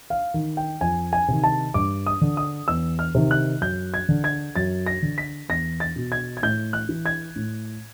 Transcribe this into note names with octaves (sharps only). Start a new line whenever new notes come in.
F5
D#3
G5
F2 G#5
G#5
C3 D#3
A5
G2 D6
D#6
D3
D#6
E2 E6
F6
C3 D#3
F#6
F#2 G6
G#6
D3
G#6
F#2 A6
A#6
D3
B6
E2 A#6
A6
B2
G#6
G#6
A2 G6
F#6
E3
G#6
A2